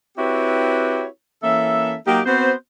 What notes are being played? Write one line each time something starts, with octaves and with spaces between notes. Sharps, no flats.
C4 E4 F#4 G4 B4 C#5
E3 A#3 C#4 A4 E5
F#3 A#3 D#4 G4
B3 C4 F#4 C5